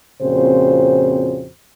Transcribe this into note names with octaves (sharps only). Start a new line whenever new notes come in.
F2 A#2 C#3 C4 F#4 C5